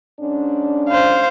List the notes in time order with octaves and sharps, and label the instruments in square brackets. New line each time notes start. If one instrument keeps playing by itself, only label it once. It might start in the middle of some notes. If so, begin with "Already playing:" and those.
[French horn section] G#2 C#4 D4
[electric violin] C5 F5